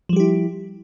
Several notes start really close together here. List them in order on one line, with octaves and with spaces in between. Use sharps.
F3 G3 G4 E4